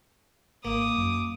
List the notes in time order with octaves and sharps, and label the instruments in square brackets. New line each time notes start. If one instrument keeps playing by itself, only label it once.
[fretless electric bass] G#1 [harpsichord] A#3 [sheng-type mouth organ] D6 [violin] D#6
[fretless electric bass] F#2